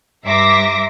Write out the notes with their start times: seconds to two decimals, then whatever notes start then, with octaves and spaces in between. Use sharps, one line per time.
0.25 G2 E5 A#5 C6 D6 A#6